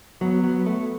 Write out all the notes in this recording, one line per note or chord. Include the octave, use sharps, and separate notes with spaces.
F#3 B3
F#3
A3